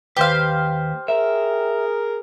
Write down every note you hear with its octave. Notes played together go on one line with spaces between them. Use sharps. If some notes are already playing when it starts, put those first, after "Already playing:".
D#2 G4 B4 C5 F5
G#4 A#4 E5